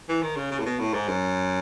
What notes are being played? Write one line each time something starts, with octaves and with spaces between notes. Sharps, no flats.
E3
D#3
C#3
C#3
A2
B2
A2
G#2
F#2